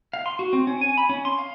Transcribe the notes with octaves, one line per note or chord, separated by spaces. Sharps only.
F5
C6
F#4
C4
C#4
G#5
B5
C#4
C6
F5